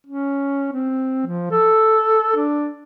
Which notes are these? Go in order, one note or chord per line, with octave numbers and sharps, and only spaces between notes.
C#4
C4
F3
A4
D4